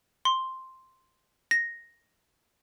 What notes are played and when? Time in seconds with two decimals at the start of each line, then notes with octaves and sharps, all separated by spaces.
0.25 C6
1.51 A#6